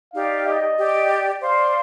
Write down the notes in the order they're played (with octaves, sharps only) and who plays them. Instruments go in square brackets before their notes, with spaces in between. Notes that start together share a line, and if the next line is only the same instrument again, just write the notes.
[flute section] D#4 G4 D5 [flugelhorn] F5
[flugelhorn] D#5
[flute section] G4 D5 G5
[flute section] C5 F5 C6 [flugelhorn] D5